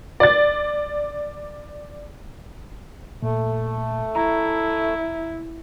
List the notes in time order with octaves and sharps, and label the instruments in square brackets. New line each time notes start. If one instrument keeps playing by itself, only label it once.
[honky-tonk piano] D5 A6
[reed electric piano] A#2 [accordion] A3
[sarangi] E4 [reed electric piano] A#5